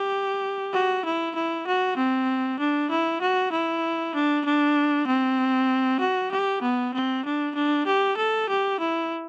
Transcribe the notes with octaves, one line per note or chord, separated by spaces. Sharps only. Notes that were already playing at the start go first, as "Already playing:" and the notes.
Already playing: G4
F#4
E4
E4
F#4
C4
D4
E4
F#4
E4
D4
D4
C4
F#4
G4
B3
C4
D4
D4
G4
A4
G4
E4